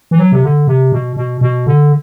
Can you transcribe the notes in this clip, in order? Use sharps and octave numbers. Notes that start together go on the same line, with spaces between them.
E3
F#3
C3
D3
C3
B2
B2
B2
D3